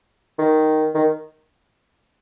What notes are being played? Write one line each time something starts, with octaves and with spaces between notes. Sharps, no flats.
D#3
D#3